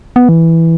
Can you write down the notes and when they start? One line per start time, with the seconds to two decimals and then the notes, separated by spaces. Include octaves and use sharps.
0.16 B3
0.29 E3